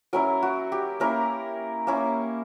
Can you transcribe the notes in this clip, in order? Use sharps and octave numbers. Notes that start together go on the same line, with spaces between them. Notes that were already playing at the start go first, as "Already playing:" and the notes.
F#3 C#4 E4 A#4
F#4
G4
A#3 C#4 E4 A#4
A#3 C#4 E4